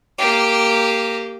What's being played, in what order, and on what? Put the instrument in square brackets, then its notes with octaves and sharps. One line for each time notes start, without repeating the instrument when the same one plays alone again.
[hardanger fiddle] A#3 G4